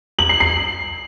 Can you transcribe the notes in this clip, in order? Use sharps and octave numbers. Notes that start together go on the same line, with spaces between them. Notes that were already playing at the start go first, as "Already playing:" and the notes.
F#7
C7
C7